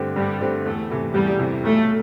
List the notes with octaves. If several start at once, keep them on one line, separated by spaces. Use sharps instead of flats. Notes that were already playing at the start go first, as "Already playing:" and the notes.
Already playing: G2 D3 A3 C4 G4
G2 G3
D3 A3 C4 G4
E2 A3
C3 E3 A3
E2 G3
C3 E3 A3
B1 A3